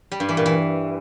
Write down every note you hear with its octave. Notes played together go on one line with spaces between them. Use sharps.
G3
G2
E3
A#2
E3